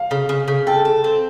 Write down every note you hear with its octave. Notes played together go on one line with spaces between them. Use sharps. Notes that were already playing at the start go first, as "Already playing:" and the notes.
Already playing: F5
C#3
C#3
C#3
A4 G5
A4
C4